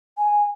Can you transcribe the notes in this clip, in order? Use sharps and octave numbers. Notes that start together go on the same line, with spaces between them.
G#5